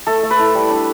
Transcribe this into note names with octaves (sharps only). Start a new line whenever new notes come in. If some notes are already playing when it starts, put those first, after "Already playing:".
A3 A4
A3
B4
E4
G3
D4